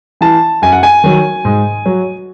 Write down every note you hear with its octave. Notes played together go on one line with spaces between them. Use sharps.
E3 A5
F#2 G#5
F#5
G#5
D#3 F#3
G#2
F#3